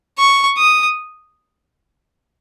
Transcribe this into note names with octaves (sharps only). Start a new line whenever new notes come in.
C#6
D#6